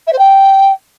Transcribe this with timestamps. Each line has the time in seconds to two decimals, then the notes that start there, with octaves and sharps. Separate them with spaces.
0.07 E5
0.12 C5
0.18 G5